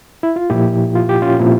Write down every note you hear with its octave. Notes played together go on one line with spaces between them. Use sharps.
E4
F4
A#2 F3 E4 G4
F4
G4
C#4 F4
A#2 F3 C4 E4